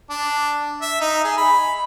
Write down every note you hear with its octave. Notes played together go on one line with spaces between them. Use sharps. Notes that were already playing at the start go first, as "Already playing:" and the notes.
D4
E5
D#4
G#4
B5